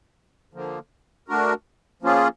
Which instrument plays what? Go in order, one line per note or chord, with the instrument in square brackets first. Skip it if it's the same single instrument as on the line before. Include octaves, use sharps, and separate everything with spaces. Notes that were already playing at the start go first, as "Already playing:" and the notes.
[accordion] D3 F3 A#3
A3 D4 F#4 A#4
F3 A#3 C#4 F4 G#4